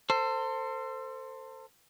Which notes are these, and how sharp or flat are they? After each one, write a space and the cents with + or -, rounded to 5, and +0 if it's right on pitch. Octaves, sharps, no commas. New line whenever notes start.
A4 +35 C5 +0